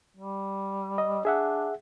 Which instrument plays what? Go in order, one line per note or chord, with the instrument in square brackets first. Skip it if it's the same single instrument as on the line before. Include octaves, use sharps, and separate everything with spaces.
[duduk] G3
[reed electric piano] D#5
[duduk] D4 [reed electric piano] G#4 E5 F#5